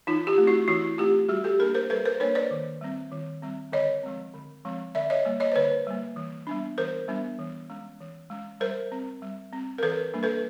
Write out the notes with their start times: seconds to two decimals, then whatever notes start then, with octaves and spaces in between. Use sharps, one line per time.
0.07 E3 D#4 F4
0.27 F4 G4
0.38 A3 C4
0.47 E4 F#4
0.68 E3 E4 F#4
0.98 A3 C4 F4 G4
1.29 G3 F#4 G#4
1.44 G4 A4
1.59 A#3 D4 G#4 A#4
1.74 A#4 C5
1.90 G3 A4 B4
2.05 A#4 C5
2.20 A#3 D4 B4 C#5
2.35 C5 D5
2.51 D#3
2.81 G3 C4
3.12 D#3
3.42 G3 C4
3.72 D3 C#5 D#5
4.03 F3 G#3 C4
4.34 D3
4.65 F3 G#3 C4
4.95 D3 D5 E5
5.10 C#5 D#5
5.25 G3 A#3
5.40 C#5 D#5
5.52 C5
5.55 D3 B4 C#5
5.87 G3 A#3
6.16 E3
6.47 G3 B3 D4
6.78 E3 A#4 C5
7.08 G3 B3 D4
7.39 E3
7.70 G#3 C#4
8.00 E3
8.30 G#3 C#4
8.60 G3 A#4 C5
8.92 C4
9.22 G3
9.52 C4
9.78 A#4
9.83 E3 A4 B4
10.14 G3 A#3 D4
10.23 A4 B4